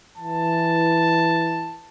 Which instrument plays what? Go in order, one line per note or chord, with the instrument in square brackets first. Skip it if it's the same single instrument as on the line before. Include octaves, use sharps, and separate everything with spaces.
[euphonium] E3 [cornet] A5